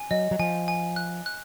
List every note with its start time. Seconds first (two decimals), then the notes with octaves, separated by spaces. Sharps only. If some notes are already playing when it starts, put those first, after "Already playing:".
Already playing: G#5
0.11 F#3 D#5
0.31 F#3
0.39 F3 G#5
0.68 G#5
0.96 F#6
1.26 F#6